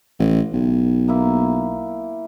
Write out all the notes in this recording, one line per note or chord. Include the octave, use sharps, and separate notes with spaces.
A1
B1
A#3 E4